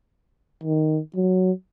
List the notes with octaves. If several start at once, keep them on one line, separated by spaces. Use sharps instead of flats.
D#3
F#3